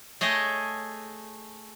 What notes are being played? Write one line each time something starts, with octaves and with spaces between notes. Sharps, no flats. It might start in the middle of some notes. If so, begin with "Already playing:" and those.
A3 G#4 C#5 D#5 G5